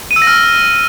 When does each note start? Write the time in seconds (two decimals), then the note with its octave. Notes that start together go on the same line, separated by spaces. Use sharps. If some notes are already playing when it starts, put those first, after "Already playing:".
0.11 D#7
0.16 E6
0.22 A#6
0.27 F6